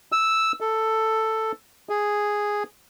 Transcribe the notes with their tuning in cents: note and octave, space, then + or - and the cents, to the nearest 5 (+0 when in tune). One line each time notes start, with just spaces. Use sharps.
E6 -5
A4 +5
G#4 -5